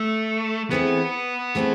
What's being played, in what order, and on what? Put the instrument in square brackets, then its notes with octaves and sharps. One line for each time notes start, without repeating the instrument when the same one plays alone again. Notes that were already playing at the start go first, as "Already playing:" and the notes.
Already playing: [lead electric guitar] A3
[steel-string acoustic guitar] E3 A3 C4 G#4 [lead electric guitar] B3
[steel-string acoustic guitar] E3 A3 C4 G#4